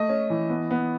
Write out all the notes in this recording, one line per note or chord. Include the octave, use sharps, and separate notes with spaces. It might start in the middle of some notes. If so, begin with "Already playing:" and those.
Already playing: A3 D#5
C#4
E3
B3
B3